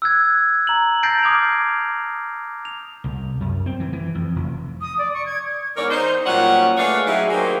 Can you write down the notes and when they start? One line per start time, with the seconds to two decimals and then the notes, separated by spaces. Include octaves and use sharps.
0.02 E6 F#6 G#6
0.67 A#5 F#7
1.03 A5 G6 A6 A#6 C7 D7
1.23 D6 D#6 F6 G#6 F7
2.65 F7
3.04 C2
3.40 F#2
3.66 C4
3.80 E3
3.93 E3
4.15 F2
4.36 F1
4.81 D#6
4.98 D5
5.14 C#6
5.26 G#6
5.76 E2 G#2 A#4 C#5 D5
5.90 D#4 C5
6.26 A#2 F#3 G3 C#4 F#5
6.78 A3 G#4 B4 C#5 D5 F5
7.06 F#3 G3 D#4 E4 G#4
7.30 D#3 F#3 A#3 F#4 G#4 C5